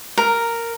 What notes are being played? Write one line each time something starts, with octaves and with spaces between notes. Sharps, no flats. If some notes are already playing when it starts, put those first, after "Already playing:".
A#4